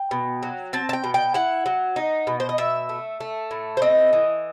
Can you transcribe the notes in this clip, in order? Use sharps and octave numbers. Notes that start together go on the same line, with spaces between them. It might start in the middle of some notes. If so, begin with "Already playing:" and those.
Already playing: G5
B2
F#3
C4 A5
A5
G5
B2
G5
E4 F#5
F#3
D#4
B2
C5
D#5
B2 E5
A3
A3
A2
C5
C4 D#5
E3